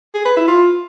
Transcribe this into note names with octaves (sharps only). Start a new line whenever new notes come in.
G#4
B4
E4
F4